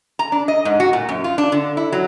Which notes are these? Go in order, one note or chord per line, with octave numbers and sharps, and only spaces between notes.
A#5
D4
D#5
G#2
F#4
A#2
F#2
F4
D4
D3
E4
F#3